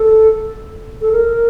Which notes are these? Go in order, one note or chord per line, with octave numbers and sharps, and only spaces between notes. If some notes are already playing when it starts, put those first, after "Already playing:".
Already playing: A4
A4
A#4